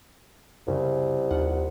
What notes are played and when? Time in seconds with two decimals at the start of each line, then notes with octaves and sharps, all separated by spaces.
0.68 C2 F#2 C#3
1.31 D#2 F4 F#5